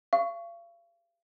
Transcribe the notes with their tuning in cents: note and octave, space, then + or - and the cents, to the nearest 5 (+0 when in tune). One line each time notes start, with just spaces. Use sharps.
F5 -40 C#6 +10